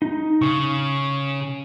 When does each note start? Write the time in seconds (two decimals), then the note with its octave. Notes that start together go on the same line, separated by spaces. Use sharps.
0.02 D#4
0.42 C#3 C#6